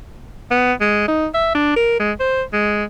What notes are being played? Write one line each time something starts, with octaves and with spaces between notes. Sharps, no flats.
B3
G#3
D#4
E5
D4
A#4
G#3
C5
G#3